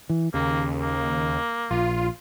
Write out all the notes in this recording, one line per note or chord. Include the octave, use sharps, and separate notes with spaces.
E3
D#2 C#3 A#3
A#3
A#1 F4